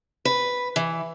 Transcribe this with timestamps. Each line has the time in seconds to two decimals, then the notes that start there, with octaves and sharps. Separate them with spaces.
0.25 B4
0.76 E3